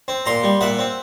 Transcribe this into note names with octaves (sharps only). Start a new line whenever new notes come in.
C4
A#2 A#5 C6
G3
A#2 E5 F#5
C4